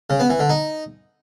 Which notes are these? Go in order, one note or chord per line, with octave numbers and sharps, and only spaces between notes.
C#3
B3
E3
D3
D#4